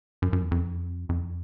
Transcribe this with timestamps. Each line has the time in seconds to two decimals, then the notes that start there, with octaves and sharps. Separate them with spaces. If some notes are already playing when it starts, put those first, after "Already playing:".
0.22 F#2
0.33 F#2
0.42 E2
0.51 F2
1.09 F2